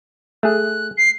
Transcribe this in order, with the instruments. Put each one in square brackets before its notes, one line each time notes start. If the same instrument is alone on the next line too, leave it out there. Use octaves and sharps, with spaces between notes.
[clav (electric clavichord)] A3 G#4 [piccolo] F#6
[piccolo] C7